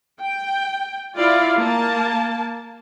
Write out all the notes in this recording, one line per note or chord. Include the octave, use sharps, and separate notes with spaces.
G5
E4 F4 D5 F5
A#3 A5